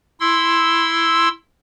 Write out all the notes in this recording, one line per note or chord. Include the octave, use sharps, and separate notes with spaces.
E4 C6 E6